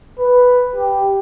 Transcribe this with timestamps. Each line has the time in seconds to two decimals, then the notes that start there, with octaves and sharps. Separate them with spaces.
0.19 B4
0.76 G4